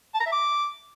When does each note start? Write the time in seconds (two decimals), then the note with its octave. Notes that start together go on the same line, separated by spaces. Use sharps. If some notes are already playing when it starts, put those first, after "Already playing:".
0.14 A5
0.20 A#5
0.26 E5
0.32 D6